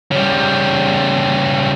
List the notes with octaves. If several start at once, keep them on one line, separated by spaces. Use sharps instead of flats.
C#3 G3